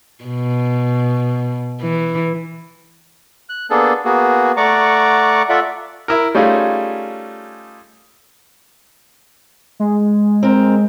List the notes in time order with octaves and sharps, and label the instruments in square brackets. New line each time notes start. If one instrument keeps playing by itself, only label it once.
[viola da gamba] B2
E3
[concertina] F#6
A#3 B3 D4 G#4 A4
A#3 B3 F#4 G#4
A3 D5 F#5 A#5 C#6 D6
F4 A4 D5 E5 F#5
[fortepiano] E4 A#4
G3 A3 C#4 D#4 F4 G#4
[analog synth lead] G#3
[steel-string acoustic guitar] C4 A#4